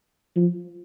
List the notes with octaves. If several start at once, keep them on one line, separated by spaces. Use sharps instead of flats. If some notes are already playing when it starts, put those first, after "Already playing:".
F3